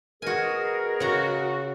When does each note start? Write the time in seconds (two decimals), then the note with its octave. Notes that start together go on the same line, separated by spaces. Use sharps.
0.22 B2 F#4 G#4 A#4 G#5
1.00 C#3 F#4 A#5